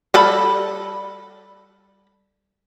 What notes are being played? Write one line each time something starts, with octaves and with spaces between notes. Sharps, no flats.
G3 A4 B5